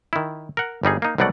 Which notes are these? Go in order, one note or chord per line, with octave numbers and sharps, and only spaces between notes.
D#3 E4
A#4 F#5
G1 G3 D#4 G#4
A#3 D#4
C2 B2 F#3 A3 D5 F#5